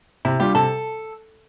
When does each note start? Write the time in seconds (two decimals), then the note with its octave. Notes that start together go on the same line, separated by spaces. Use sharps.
0.25 C3 E4
0.40 G3 D4 F4 G4
0.55 C3 A4